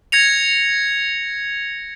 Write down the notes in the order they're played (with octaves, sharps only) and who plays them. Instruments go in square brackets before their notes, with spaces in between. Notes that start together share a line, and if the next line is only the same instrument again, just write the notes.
[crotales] G#6 A#6 C#7 F7